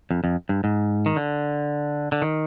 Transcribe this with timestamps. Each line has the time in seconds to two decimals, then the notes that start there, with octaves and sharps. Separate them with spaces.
0.11 F2
0.24 F2
0.49 G2
0.64 G#2
1.06 D#3
1.16 D3
2.12 D3
2.22 D#3